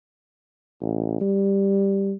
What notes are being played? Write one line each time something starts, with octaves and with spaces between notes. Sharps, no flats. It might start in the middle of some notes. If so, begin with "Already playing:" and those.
A1
G3